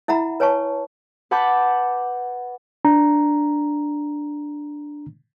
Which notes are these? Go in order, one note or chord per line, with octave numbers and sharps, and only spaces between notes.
E4 E5 F#5 A#5 B5
B4 C#5 G#5 A5 C#6
B4 F#5 A5 B5 D6 G6
D4 A#5